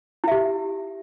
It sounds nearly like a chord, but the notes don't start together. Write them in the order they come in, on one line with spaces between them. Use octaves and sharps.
E4 E5 G4